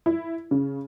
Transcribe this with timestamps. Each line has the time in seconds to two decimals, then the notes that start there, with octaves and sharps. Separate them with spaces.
0.06 E4
0.51 C#3